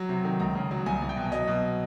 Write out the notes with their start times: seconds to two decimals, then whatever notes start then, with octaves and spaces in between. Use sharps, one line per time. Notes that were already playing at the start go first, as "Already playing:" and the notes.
Already playing: F#3
0.09 C3
0.25 D#3
0.40 C#2 A#5
0.55 C#3
0.71 F#3
0.86 C2 G#5
1.02 C2
1.09 G5
1.17 B2
1.32 F#3 D#5
1.47 B2